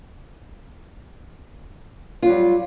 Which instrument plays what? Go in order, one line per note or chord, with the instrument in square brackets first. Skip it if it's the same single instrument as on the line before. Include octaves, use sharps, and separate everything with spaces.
[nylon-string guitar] F4
F#3
G3